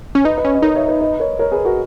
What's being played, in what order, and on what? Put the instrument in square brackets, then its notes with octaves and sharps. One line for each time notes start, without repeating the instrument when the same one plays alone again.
[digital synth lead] C#4
[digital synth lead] D#4 [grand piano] B4 D#5
[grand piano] B4 D#5
[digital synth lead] C#4
[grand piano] D#5
[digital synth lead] D#4 [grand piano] A#4 C#5
[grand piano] C#5 E5
B4 D#5
B4 D#5
A#4 C#5
A#4 C#5
G#4 B4
F#4 A#4